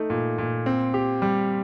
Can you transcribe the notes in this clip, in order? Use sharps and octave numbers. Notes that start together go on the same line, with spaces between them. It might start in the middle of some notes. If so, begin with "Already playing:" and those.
Already playing: A3 D#4
A#2
A#2
C4
G4
G3